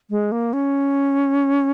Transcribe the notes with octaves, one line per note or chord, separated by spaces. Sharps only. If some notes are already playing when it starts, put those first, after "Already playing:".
G#3
A#3
C#4